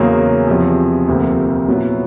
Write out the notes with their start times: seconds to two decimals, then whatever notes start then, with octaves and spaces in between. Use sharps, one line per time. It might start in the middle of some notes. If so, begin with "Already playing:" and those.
Already playing: E2 C#3 F#3 A#3
0.47 E2 C3 F3
1.08 D2 C3 F3 A#3
1.68 A#2 F#3 B3 E4